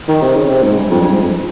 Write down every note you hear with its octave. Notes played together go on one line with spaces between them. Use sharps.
D#3
C3
C#3
C3
G#2
G2
F2
G2
G#2
F2